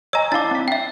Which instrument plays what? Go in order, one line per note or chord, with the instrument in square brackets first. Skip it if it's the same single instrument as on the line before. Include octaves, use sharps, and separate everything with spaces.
[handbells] C#5 D#5 G#5 [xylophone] A#5 E6
[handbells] D4 E4 F5 [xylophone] D6 A6
[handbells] C4 B6
[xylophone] E5 G5